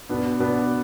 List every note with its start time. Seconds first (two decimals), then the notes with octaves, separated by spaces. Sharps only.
0.09 B2 B3 D4
0.40 B2 B3 D4